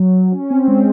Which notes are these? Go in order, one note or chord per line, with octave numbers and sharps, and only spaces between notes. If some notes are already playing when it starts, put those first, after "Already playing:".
Already playing: F#3
C#4
C4
G#3